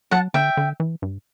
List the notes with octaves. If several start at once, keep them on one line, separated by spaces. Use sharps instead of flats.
F#3 F#5 A5
D3 E5 G5
D3
E3
G2